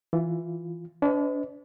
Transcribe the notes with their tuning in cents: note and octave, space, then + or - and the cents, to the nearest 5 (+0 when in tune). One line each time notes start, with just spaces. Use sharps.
E3 +5 F4 +0
D4 -35 B4 +45 D#5 +10